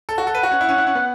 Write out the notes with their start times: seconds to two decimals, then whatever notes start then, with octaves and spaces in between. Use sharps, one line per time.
0.09 A4
0.18 F#4
0.26 A4 F#5
0.35 B4
0.43 F#4
0.51 C#4
0.61 E4
0.69 C#4
0.78 E4
0.87 C#4
0.95 B3